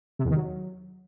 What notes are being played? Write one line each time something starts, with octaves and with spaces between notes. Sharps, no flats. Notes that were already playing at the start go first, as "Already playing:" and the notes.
C3
E2
D#3
F#3